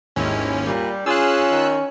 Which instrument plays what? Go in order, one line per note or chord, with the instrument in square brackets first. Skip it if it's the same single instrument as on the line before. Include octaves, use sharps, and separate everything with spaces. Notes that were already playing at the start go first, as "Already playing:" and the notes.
[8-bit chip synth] G#1 D#2 C#4 [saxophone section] G3 G#3 E4
[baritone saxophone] A#2 [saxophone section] G3
[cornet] C#4 [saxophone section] F4 [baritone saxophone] G#4 [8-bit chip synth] E6 F#6
[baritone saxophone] D#3